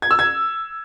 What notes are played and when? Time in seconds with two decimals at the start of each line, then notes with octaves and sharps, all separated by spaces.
0.02 G#6
0.11 E6
0.19 G#6